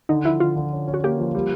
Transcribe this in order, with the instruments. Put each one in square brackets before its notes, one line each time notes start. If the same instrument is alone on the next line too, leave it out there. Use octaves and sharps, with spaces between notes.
[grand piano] D3 [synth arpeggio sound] D#4
[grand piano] F3 [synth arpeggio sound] E4
[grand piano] D3 [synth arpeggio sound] F4
[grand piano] D3
C#4
C#4
[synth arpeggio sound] F#4
[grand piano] A#3 [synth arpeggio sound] G4
[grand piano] F3
G3